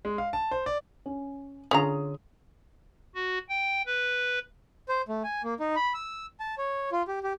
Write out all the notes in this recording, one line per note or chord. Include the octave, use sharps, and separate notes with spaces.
G#3
F5
A5
C5
D5
C#4
D3 C#4 F4 G#4 A#5 D#6
F#4
G5
B4
C5
A3
G#5
A#3
D#4
B5
E6
A5
C#5
F4
G4
G4